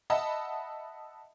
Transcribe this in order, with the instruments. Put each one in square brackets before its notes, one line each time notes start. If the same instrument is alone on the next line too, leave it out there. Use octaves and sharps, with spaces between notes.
[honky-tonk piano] D#5 E5 F#5 A5 B5